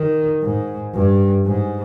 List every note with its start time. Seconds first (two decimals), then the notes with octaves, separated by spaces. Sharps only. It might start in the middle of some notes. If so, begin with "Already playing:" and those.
Already playing: D#3
0.42 G#2
0.94 G2
1.45 G#2